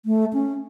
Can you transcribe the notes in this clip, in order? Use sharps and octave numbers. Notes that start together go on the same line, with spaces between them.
A3
C#4